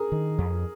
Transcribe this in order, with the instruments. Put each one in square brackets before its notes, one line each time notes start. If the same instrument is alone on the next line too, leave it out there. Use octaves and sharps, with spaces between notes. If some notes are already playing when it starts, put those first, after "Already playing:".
Already playing: [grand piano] G#4 A#4
[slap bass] D#3
F2